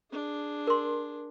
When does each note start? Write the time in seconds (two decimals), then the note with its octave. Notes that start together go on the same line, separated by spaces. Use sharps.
0.10 D4 G#4
0.67 A#4 C6